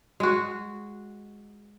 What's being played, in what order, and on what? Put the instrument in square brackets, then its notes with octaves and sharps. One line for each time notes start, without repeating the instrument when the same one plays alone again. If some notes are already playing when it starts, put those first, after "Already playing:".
[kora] G#3 F#4